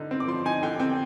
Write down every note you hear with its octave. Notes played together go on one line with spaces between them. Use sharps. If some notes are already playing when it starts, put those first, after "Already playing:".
Already playing: D3 D#4
C4
D6
F3 C6
D#4 G#5
D3 G5
C4 G5